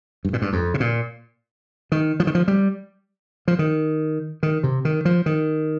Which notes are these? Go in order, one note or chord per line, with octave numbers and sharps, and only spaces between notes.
G2
A#2
G2
F2
C3
A#2
D#3
F3
D#3
F3
G3
F3
D#3
D#3
C3
D#3
F3
D#3